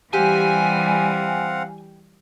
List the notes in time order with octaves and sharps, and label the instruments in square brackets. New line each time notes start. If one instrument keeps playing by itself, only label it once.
[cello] E3 G3 [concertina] C4 F5 F#5 [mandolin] G4 [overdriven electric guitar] G#5